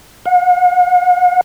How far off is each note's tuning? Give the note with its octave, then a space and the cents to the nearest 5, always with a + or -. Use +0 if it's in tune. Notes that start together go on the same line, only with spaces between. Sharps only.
F#5 -45